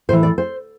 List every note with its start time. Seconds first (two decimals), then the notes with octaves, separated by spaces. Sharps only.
0.09 A2 C5
0.13 E3
0.23 D5
0.38 C5